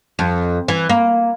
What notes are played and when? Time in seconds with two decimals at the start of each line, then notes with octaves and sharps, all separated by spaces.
0.19 F2
0.68 E3
0.90 A#3